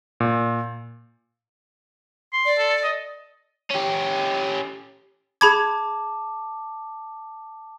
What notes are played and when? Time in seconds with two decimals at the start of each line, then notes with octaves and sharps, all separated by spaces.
0.20 A#2
2.33 C6
2.45 D5
2.58 A4
2.83 D#5
3.71 C#4 G4
5.41 G#4 A5 B5 D6 G#6